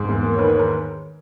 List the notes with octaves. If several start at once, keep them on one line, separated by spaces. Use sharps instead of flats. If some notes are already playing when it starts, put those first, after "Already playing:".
Already playing: G#2
E2
A#3
C#5
D#3 B4
C#5
A#4